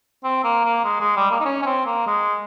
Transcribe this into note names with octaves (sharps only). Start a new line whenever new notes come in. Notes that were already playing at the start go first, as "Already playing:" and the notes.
C4
A#3
A#3
G#3
G#3
G3
A#3
D#4
C#4
C#4
C4
A#3
G#3